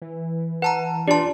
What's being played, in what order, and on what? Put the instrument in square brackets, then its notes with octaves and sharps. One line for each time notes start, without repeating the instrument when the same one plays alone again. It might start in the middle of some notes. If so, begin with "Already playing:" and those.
[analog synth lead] E3
[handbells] B4 A5 A#5 [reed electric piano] F#5
[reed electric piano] D4 C6 [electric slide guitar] F4 D5 [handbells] G4 A5